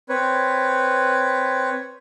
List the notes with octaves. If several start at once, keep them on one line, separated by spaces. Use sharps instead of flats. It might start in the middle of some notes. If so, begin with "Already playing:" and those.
C4 B4 C#5